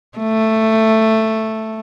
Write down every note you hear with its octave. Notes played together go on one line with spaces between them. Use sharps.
A3